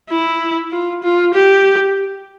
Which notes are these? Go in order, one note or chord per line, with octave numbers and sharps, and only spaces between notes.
E4
F4
F4
G4